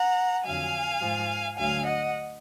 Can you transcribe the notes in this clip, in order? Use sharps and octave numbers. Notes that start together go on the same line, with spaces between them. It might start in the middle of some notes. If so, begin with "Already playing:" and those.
Already playing: F#5 A#5
F2 D3 F#3 F5 G#5
G#2 F3
D2 D3 F#3 F5 G#5
D#5 F#5